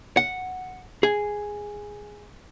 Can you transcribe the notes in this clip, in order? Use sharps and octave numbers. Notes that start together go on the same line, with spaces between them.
F#5
G#4